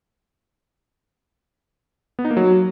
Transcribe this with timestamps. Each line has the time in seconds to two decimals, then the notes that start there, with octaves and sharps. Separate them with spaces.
2.19 B3
2.25 D#4
2.31 A#3
2.37 F#3